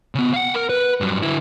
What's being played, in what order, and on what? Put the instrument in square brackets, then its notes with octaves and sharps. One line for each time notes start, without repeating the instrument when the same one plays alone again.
[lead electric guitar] C#3 B3
F5 F#5
A#4
B4
G2 F#3
D3 E4